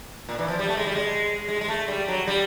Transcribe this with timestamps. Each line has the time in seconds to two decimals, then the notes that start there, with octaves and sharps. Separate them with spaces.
0.29 A#2
0.38 E3
0.48 F3
0.59 G3
0.68 A3
0.77 G#3
0.87 G3
0.95 G#3
1.48 G#3
1.61 G#3
1.68 A3
1.88 G3
2.08 F#3
2.27 G3